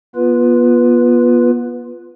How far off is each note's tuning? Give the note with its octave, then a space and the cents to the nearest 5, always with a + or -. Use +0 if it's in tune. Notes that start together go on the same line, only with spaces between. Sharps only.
B3 -30 F4 +0 B4 +0